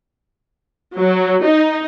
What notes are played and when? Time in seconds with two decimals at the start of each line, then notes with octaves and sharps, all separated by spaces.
0.98 F#3
1.45 D#4